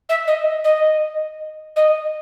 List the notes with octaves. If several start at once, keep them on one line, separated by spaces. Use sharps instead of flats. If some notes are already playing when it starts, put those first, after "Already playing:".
E5
D#5
D#5
D#5